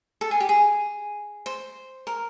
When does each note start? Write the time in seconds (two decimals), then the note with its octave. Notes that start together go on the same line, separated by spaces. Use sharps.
0.21 A4
0.31 G#4
0.40 G4
0.49 G#4
1.46 C5
2.07 A#4